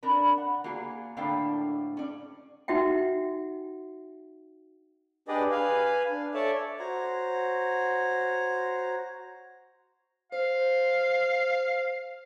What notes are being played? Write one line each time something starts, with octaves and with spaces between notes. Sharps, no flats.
D4 A#4 B4
F#5
A#3 F4 F#4 G#4
A2 D3 A#3 D4 F5 G5
C#4 D5
D#4 F#4 E5 F#5 G5
D4 G4 G#4 B4 D5 D#5
B4 F5 G#5
D4
A4 C#5 D5 E5 A5
F#4 C5 C#5 A#5
C5 F5